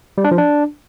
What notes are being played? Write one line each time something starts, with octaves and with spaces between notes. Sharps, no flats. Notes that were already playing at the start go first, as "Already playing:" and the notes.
G3
D4
F3
D4